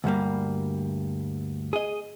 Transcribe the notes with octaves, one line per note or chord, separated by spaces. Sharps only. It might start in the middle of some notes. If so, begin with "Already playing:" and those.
D2 G2 G3 A#3
G#4 D#5